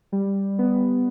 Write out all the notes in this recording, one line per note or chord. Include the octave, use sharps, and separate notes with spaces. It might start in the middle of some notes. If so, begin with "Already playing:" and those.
G3
B3